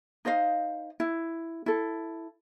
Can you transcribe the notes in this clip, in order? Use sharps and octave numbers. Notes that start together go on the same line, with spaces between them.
D#4 C5 D#5 F5
E4
E4 A4